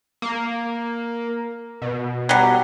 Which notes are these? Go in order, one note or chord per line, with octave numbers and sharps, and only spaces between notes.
A#3
B2
F#3 G3